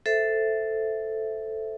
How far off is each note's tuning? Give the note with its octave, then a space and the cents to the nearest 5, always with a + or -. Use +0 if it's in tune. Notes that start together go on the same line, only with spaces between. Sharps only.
A4 +0 C5 -10 E5 +0